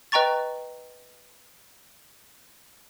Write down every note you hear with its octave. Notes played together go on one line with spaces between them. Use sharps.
B4 D#5 G5 A#5 C#6 A6